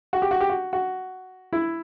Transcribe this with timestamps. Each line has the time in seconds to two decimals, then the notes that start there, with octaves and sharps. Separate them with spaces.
0.13 F#4
0.22 G4
0.31 F#4
0.40 G4
0.49 F#4
0.73 F#4
1.53 E4